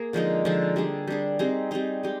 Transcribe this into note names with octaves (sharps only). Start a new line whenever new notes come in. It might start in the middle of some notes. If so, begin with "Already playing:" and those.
Already playing: A#3 G#4
D3 F3 G#3 D#4
D3 F3 G#3 D#4
G3 D4 G#4
G3 D4 G#4
G3 C4 D#4 G#4
G3 C4 D#4 G#4
G#3 D#4 G4